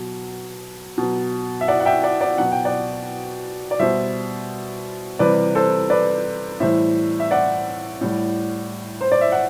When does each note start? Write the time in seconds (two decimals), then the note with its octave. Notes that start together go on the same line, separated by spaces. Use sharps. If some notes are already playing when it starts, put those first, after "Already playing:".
Already playing: B2 F#3
0.98 B2 F#3
1.61 E5
1.68 D5 F#5
1.80 F#5
1.86 E5 G5
2.03 D5 F#5
2.21 D5 F#5
2.38 B2 F#3 F#5
2.52 G5
2.65 D5 F#5
3.71 D5
3.80 B2 G3 C5 E5
5.19 C3 E3 G3 B4 D5
5.55 A4 C5
5.90 B4 D5
6.60 A2 E3 G3 C5 E5
7.20 E5
7.31 D5 F#5
8.01 A2 G3
9.01 C5
9.12 D5
9.21 E5
9.32 F#5